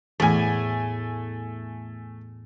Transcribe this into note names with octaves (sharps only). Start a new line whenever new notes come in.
E2 A2 A3 G#5